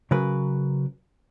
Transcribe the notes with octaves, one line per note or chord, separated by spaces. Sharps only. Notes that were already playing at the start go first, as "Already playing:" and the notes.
C#3 F#3 A#4 B4